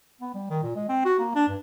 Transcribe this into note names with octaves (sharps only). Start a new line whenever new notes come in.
B3
G3
D#3
A#2
G#3
C4
F#4
A#3
D4
G2